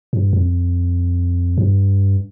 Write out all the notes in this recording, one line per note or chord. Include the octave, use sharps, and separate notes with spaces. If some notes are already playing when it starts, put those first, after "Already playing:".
G2
F2
G2